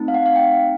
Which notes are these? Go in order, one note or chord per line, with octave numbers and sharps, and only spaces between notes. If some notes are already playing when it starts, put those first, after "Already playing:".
Already playing: A3 C4 D#4
F5
F#5
F5
G5